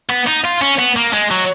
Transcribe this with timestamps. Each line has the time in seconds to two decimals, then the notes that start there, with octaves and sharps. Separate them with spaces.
0.09 B3
0.27 D#4
0.44 F4
0.61 C#4
0.79 B3
0.96 A#3
1.13 G#3
1.30 F#3